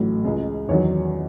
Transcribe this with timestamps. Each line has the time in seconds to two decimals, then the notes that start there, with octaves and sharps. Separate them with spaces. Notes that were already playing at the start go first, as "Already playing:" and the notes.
Already playing: A1 A2 F#3
0.24 C#2 C#3 G#3
0.68 E2 D#3 F#3 C#5